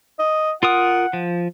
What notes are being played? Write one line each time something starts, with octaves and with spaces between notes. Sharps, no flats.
D#5
F4 A#4 F#5 D#6
F3